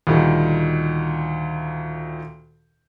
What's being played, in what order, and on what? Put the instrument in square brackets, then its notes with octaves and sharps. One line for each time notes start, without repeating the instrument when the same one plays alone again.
[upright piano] D2 A#2 D#3 G3